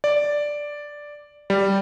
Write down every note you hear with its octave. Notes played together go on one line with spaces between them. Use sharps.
D5
G3